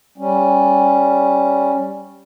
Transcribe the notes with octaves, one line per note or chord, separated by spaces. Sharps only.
G3 C#4